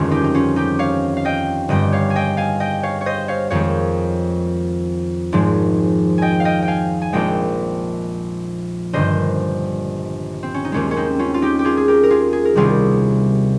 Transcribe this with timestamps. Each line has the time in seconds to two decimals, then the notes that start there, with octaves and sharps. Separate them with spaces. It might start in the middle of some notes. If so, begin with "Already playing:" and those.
Already playing: G1 F2 D#3 G#3 C#4 F4
0.11 D#4 G4
0.24 D#4
0.34 C#4 F4
0.56 D#4 G4
0.79 C#5 F5
1.17 F5
1.25 D#5 G5
1.69 G1 G2 G3 D#5 G5
1.92 C#5 F5
2.10 G#5
2.16 D#5 G5
2.37 F5 G#5
2.60 D#5 G5
2.83 C#5 F5
3.01 C#5
3.06 C5 D#5
3.28 C#5 F5
3.50 F2 D#3 G#3 C#5 F5
5.32 G#1 G#2 F3 G#3
6.18 D#5 G5 G#5
6.40 F5
6.45 D#5 G5
6.62 G5
6.68 F5 G#5
7.02 G#5
7.13 A#1 A#2 F3 G#3 D#5 G5
8.93 G1 G2 D#3 C5 D#5
10.43 C4
10.54 C#4
10.65 D#4
10.72 D#2 D#3 G#3 C#4 F4
10.91 C#4
10.96 C4 D#4
11.19 C#4 F4
11.34 F4
11.42 D#4 G4
11.59 G4
11.65 F4 G#4
11.77 G#4
11.88 G4 A#4
12.03 A#4
12.10 F4 G#4
12.33 G#4
12.45 A#4
12.56 C2 C3 D#3 G3 F4 G#4